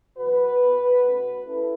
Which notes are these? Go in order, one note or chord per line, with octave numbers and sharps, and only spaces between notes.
E2 B2 F#3 F#4 B4
B2 B3
B2 A3 C#4
A3 C#4 E4 A4